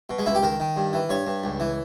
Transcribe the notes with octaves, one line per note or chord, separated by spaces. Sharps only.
B2
G#3
C#2 E4
G4
D#3 A#4
D#3
G2
E3
G2 C#5
G2
C#2
E3